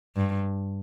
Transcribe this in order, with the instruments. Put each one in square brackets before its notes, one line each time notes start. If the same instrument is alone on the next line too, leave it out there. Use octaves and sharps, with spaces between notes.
[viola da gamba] G2